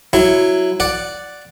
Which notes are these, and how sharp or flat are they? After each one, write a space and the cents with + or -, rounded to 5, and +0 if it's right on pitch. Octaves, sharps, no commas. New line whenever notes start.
F#3 +0 E4 +0
D5 +0 F#5 +0